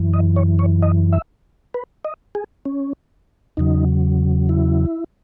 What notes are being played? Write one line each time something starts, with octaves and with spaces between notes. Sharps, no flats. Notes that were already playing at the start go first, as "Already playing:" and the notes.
Already playing: F#2 E3
D#5
C#5
C#5
D#5
E5
B4
D#5
G#4
C#4
E2 C#3 F#3 D#4
E4